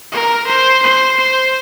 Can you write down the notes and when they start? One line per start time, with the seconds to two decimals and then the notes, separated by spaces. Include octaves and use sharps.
0.12 A#4
0.47 C5
0.82 C5
1.17 C5